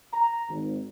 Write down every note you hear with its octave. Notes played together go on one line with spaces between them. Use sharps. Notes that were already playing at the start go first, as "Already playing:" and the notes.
A#5
G#1